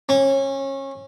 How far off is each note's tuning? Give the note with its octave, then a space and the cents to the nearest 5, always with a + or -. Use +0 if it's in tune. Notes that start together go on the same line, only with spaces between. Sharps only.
C#4 -25